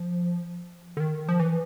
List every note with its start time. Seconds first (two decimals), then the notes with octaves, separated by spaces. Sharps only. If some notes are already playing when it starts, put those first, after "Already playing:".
Already playing: F3
0.97 D3
1.00 D#3
1.29 F3
1.40 E3